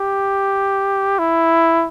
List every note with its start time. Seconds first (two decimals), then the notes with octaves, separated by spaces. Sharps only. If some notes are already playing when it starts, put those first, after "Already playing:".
Already playing: G4
1.19 E4